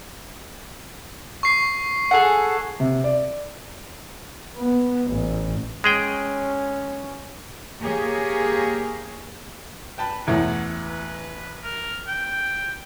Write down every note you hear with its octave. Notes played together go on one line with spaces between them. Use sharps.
C#6 C7
G#4 A4 F#5
C3
D5
B3
A1
G#3 C#4 G#4 G5
A#3 G4 G#4 C#5
B4 G5 A5 B5
A1 E2 A2 F#5
B4
A#4
G5